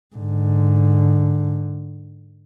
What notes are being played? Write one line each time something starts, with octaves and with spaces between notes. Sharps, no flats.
G#2 D3